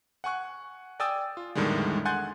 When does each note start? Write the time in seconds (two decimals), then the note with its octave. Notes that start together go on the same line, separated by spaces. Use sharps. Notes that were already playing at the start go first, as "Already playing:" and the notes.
0.24 F#5 G#5 C#6 F#6
1.00 D5 G5 G#5 D#6 E6 A6
1.37 F4
1.55 E2 A2 D3 D#3 G3 G#3
2.05 F#5 G#5 C6 F#6 G6 A6